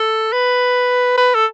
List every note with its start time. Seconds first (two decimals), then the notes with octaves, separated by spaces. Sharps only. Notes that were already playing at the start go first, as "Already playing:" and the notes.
Already playing: A4
0.33 B4
1.17 B4
1.35 A4